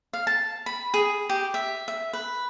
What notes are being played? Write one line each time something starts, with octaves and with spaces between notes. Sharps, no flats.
F5
A5
B5
G#4
G4
E5
E5
B4